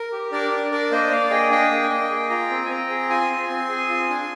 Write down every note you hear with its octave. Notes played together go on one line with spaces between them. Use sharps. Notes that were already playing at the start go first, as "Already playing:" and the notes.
Already playing: A#4
G4
D4 A#4 D5
D4
D4 A#4 D5
A#3 C5 D#5
A#3 D5 F5
G#4 D#5 G5
D4 D#5 G5
A#3
G#5
A#3 D#5 G5
G#4
F4 G5 A#5
C4
G#5
C4 G5 A#5
G#4
F4 G#5 C6
C4
C4
G#4
F4
D4